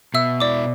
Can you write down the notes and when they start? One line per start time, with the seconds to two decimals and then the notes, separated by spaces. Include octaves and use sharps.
0.14 B2 E5 E6
0.40 E4 D5 D6